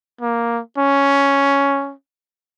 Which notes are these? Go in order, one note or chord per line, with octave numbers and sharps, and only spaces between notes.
A#3
C#4